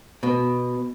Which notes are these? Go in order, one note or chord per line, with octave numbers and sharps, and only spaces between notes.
B2